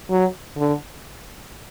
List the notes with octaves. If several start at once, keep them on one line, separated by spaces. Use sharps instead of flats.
F#3
D3